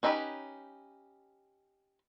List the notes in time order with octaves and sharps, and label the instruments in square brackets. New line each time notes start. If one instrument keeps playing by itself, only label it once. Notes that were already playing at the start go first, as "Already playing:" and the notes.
[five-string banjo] C#4 D#4 E4 G4 B4